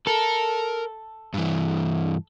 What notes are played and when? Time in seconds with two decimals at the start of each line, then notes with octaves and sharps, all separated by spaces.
0.07 A4 A#4
1.34 G2 E3